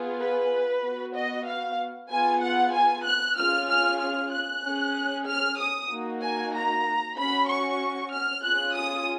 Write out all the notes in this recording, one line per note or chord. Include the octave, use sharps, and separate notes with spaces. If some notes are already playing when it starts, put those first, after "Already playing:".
Already playing: B3 F4 G#4
B4
B3 F#4
D#5
F5
B3 F4 G#4 G#5
F#5
G#5
F#6
C#4 F4 G#4 F6
F6
F6
F#6
C#4 G#4
F6
D#6
A#3 D#4 F#4
G#5
A#5
C#4 F#4 B5
C#6
F6
C#4 F4 G#4 F#6
D#6